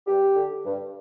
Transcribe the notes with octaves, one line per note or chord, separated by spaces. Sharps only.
G2 G4
D3
G2